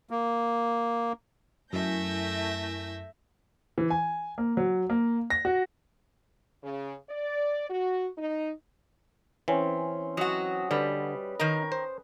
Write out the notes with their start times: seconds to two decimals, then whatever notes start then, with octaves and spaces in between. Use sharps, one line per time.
0.11 A#3
1.73 F#2 A3 E4 A#4 E5 G#5 G6 A#6
3.78 E3
3.90 G#5
4.38 A#3
4.57 F#3
4.90 A#3
5.30 A#6
5.45 F#4
6.63 C#3
7.09 D5
7.70 F#4
8.18 D#4
9.48 E3 C4 C#4 C5
10.17 F#3 F#4 D#5
10.71 D3 G3 B4
11.40 D#3 D#4 A#4
11.72 C5